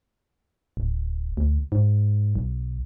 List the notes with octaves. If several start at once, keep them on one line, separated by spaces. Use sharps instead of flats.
D1
D2
G#2
B1